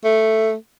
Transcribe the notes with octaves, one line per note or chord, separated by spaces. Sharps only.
A3